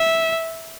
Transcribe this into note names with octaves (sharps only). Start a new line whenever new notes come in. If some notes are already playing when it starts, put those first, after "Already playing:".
Already playing: E5